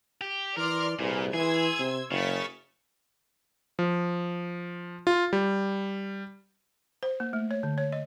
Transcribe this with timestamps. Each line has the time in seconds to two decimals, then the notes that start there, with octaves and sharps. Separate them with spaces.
0.21 G4
0.57 E3 A#4 D5 C6 F6
0.99 C2 A#2 G#4 B4
1.34 E3 G#4 C6 E6 G#6
1.79 C3
2.11 F#1 C#3 C#6 A6 B6
3.79 F3
5.07 F4
5.33 G3
7.03 C5
7.20 A#3
7.33 A3
7.51 C#5
7.63 D3
7.78 C#5
7.92 D#5